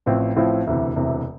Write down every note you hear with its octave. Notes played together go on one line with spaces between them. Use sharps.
A1 A2 F3 C4 E4
A1 A2 F3 C4 E4
E1 D2 C3 E3
E1 D2 C3 E3